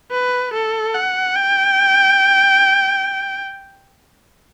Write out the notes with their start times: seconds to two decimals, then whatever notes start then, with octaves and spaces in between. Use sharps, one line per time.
0.11 B4
0.54 A4
0.94 F#5
1.36 G5